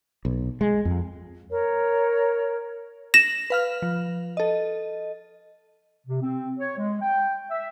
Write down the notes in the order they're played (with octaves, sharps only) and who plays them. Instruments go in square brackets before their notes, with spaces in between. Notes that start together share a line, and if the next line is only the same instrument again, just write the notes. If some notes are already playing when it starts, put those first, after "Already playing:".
[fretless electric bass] B1
G#3
F2
[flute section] A#4 C#5
[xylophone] A#6 E7 [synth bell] F#7
[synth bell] B4 F5 F6
F3
A4 D#5
[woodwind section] C3
C4
C#5
G#3
G5
E5